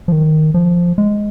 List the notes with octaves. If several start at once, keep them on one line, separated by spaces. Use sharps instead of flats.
F3
D#3
F3
G#3